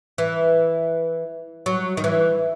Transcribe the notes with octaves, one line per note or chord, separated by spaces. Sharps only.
E3
F#3
D#3
E3